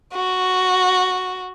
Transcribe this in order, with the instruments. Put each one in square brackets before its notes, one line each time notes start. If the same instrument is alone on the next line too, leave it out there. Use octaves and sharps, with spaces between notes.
[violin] F#4